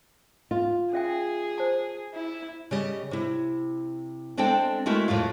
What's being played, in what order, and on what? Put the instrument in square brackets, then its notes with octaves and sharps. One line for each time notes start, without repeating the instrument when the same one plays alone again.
[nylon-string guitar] F4
[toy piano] C#4 E5 G5 [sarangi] G#4
[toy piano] C5 A5
[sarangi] E4
[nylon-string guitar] C#3 G3 D#5
C3 E4
G#3 C4 D4 A4 C5 G5
G#3 A3 E4 F#4 A#4 E5
F2 A2 C3 F4 F5